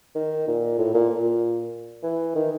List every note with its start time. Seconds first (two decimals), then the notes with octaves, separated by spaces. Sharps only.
0.15 D#3
0.47 A#2
0.78 A2
0.94 A#2
1.10 A#2
2.03 E3
2.35 D#3